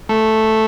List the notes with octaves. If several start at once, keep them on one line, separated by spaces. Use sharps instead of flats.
A3